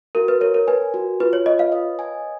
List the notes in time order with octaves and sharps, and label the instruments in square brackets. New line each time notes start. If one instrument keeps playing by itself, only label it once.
[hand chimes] F#4 [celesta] A#4
[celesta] B4
[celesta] A#4 [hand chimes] C#5
[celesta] A#4
[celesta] B4 [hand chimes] G#5
[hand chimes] F#4
[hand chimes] F4 [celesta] B4
[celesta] C#5
[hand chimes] B4 [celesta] D#5
[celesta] F5
[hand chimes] D#5
G#5